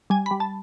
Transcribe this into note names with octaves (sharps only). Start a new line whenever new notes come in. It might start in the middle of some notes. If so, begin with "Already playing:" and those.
G3 G#5
G3 B5
A5